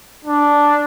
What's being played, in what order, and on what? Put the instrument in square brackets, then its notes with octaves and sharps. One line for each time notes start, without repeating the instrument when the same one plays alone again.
[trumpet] D4